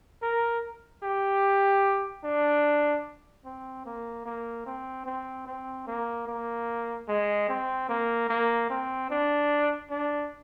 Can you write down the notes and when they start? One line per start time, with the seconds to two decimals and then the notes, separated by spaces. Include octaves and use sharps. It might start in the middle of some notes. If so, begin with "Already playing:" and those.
0.22 A#4
1.03 G4
2.24 D4
3.45 C4
3.86 A#3
4.25 A#3
4.66 C4
5.06 C4
5.47 C4
5.87 A#3
6.27 A#3
7.08 G#3
7.48 C4
7.89 A#3
8.29 A#3
8.70 C4
9.10 D4
9.90 D4